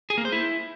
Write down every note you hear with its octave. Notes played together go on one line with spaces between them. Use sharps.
G#4
A#3
C5
E4